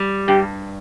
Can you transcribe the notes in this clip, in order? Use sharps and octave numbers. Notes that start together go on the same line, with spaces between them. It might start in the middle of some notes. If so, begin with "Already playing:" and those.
Already playing: G3
G2 G4